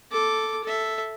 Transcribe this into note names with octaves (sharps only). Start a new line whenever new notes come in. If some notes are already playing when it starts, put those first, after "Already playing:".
A4 D6
A4 E5